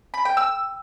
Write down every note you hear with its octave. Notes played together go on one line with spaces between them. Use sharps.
B5
G5
E6